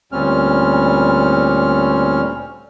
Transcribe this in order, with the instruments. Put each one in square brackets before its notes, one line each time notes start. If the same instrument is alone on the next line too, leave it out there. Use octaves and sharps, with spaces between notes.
[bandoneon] D2 A#2 G3 C4 C#4 F6